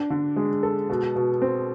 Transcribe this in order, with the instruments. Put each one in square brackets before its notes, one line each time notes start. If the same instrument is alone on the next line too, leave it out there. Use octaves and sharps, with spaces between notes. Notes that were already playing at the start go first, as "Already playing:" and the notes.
Already playing: [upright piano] D4
D3
G#3
A4
B2
B2
C4